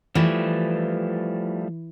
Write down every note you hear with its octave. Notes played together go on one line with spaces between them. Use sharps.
E3 F3 G3 A3